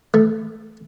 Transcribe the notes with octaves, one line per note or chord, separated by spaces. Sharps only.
A3